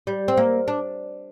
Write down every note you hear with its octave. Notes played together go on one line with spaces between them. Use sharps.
G3
C4
A#3
D4